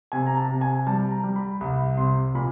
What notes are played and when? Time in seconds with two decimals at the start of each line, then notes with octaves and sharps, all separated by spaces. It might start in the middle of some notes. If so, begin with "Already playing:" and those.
0.12 C3 G#5
0.27 A#5
0.37 A5
0.49 C3
0.61 G#5
0.87 G3 A5
1.11 A#5
1.24 G3
1.36 B5
1.61 C2 B5
1.97 C3 C6
2.35 A#2 B5